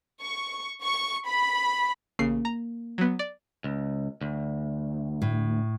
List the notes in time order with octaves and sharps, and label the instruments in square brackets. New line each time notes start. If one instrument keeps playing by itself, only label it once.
[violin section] C#6
C#6
B5
[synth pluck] A1 C#3 C7 [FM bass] A#3
[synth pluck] A#5
F#3 B3
D5
[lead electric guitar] C#2
D2
[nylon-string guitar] A2